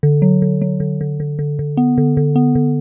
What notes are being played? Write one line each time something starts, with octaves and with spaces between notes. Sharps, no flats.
D3
F#3
D3
F#3
D3
D3
D3
D3
D3
B3
D3
D3
B3
D3